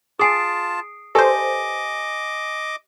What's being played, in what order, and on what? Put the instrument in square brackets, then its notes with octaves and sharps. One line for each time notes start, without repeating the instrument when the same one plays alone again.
[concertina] F4 A5 [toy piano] G#4 G#5 [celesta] D#6 C7 D7
[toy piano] G4 B4 D5 [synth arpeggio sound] A4 C5 [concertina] D#5 D6 [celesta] G#5